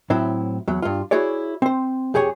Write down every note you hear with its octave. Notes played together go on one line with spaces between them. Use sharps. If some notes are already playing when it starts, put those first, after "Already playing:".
A2 F#3 C4 E4
E2 F#3
G2 F4
E4 F#4 G#4 C#5 D5
C4 C5
F2 G4 G#4 C#5 G#5